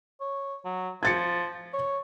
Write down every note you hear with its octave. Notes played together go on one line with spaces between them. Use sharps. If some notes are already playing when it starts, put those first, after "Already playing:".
C#5
F#3
F3 G#6 A6 C#7
C#5